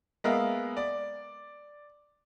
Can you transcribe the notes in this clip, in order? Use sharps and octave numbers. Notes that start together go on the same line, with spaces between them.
G#3 A#3 B3 A#4 E5 F5
D5